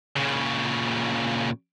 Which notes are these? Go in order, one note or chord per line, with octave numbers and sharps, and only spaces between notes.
A#2 C#3